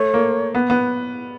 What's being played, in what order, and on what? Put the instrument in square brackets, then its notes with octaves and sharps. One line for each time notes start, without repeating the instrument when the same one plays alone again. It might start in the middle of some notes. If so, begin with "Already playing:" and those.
Already playing: [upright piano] A3 [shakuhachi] C#5
[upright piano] A#3
B3
B3